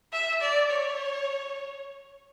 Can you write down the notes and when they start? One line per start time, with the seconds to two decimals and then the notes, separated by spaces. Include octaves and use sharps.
0.13 E5
0.41 D5
0.70 C#5